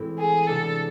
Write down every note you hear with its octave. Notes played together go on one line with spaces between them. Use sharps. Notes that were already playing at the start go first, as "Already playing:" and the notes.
Already playing: A2 E3 G#3 C4 E4
G#4
C3 G#3 B3 D4 G#4 A4